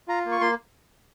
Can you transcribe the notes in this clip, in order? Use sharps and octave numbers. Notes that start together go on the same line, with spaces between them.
F4 A#5
A#3
C#6
A#3 C6